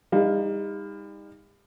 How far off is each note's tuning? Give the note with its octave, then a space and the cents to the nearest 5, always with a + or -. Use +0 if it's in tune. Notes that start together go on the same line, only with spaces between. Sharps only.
G3 +40 D#4 +20 F5 +0